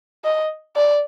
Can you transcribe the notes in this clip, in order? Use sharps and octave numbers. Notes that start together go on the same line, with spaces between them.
D#5
D5